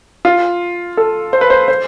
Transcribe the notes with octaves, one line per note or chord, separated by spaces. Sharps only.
F4
A4
C5
B4
C5
C5